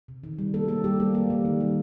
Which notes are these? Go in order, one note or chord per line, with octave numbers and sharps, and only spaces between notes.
C3
D#3
G3
A#3 A4
A#3 A4
G3 G4
G3 A#3
A#3
G3
D#3
G3